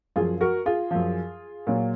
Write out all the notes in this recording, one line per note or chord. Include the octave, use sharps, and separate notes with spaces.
F#2 F3 F4 G#4
F#4 A#4
F4 G#4
F#2 F3
A#2 F#3